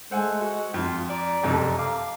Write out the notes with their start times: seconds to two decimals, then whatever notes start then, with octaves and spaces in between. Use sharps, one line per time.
0.11 G#3 A3 C5 F#5 G#5
0.41 F#4
0.74 F2 F4
1.10 D5 A#5
1.43 F#1 F2 C3 A4
1.78 F5 D6